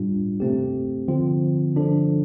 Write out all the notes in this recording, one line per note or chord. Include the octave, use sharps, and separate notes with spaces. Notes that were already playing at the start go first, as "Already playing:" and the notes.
Already playing: A2 G3 D4 F4
C3 A3 C4 G4
D3 F3 C4 F4
D3 F3 D4 A4